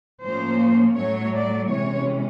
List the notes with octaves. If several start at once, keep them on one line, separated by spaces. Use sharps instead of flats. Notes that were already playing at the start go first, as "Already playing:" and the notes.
A2 F3 A#3 C#4 C5
A2 F#3 A3 C#5
D5
C3 E3 G#3 C#4 C#5